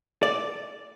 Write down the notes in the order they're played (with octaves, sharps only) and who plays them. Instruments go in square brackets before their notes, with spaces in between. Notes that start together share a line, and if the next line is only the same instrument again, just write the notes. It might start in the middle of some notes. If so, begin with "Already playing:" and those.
[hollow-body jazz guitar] D5